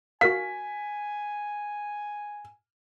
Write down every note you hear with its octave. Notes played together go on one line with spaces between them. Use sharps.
F#4 A#4 F5 G#5 B6